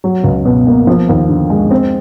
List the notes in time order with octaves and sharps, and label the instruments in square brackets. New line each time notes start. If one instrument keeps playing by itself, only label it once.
[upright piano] F#3
C#2
B2
A#3
F3
D#2
D3
G#3
C4